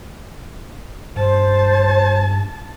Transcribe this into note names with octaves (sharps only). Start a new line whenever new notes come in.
G2 C5 A5